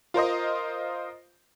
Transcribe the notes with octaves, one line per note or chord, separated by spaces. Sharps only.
F4 A#4 C5 D#5